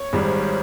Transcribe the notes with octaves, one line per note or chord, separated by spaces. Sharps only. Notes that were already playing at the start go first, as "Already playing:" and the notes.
Already playing: C#5
G#1 G#2 G3